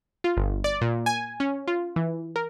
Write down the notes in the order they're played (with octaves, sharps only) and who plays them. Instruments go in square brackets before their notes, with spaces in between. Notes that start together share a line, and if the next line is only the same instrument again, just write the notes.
[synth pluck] F4
G1
D5
A#2
G#5
C#4
F4
E3
A#4